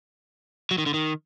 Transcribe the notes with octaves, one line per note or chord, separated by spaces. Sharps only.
F#3
D#3
D3
D#3